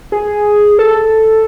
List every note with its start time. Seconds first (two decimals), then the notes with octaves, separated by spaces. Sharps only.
0.12 G#4
0.79 A4